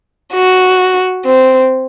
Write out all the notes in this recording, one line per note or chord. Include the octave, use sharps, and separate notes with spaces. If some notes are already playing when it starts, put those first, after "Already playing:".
F#4
C4